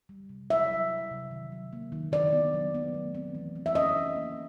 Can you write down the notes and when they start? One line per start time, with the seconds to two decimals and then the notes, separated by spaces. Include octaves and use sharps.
0.09 G3
0.29 C3
0.50 F#3 E5
0.70 F#3
0.90 F#3
1.11 C3
1.31 D#3
1.52 F#3
1.73 A#3
1.92 D#3
2.12 D#3 D5
2.33 B3
2.54 F#3
2.74 B3
2.94 A3
3.15 C4
3.35 E3
3.56 C4
3.66 E5
3.75 C#4 D#5
3.97 C#4
4.16 A#3